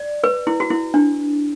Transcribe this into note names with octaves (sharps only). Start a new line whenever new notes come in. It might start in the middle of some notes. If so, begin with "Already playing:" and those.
Already playing: D5
B4
E4
F#4
E4
D4